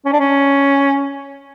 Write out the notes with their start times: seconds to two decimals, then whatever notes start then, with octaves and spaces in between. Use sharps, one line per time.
0.05 C#4
0.13 D4
0.19 C#4